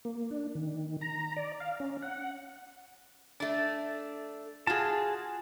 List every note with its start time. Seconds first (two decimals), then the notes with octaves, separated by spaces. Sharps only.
0.05 A#3
0.31 D4
0.55 D#3
1.01 A#5
1.37 D5
1.60 F5
1.80 C#4
2.02 F#5
3.40 A3 D4
4.67 F4 F#4 G#4 A5